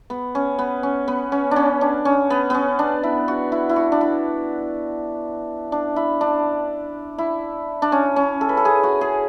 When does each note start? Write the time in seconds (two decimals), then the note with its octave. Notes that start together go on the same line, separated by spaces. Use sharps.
0.10 B3
0.35 C#4
0.59 B3
0.83 C#4
1.08 B3
1.32 C#4
1.51 C#4 D4
1.81 D4
2.05 C#4
2.30 B3
2.50 B3 C#4
2.79 D4
3.03 E4
3.28 F#4
3.52 E4
3.69 E4
3.76 F#4
3.92 D4
4.01 E4
5.72 D4
5.96 E4
6.21 D4
7.18 E4
7.82 D4
7.92 C#4
8.16 C#4
8.41 A4
8.49 B4
8.57 A4
8.65 G#4
8.83 F#4
9.01 G#4